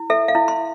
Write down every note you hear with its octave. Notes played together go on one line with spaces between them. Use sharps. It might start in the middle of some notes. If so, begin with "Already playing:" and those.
Already playing: E4
A4 E5
F5
E4
C6